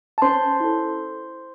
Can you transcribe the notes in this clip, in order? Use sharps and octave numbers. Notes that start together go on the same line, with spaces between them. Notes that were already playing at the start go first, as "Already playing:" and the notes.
A5
C#4 C5 C6
E4 A4